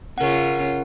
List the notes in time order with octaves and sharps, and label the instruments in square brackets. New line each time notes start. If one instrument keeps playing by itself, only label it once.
[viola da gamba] C#3 C#4 F4 [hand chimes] A#4 F#5